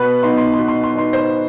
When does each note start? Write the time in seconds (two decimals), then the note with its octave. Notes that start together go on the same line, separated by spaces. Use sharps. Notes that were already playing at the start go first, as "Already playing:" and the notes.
Already playing: B2 B4 B5
0.23 B3 D#4 C6
0.38 C6
0.54 C6
0.58 B2
0.68 C6
0.84 C6
0.94 B3 D#4 C6
1.13 C5 C6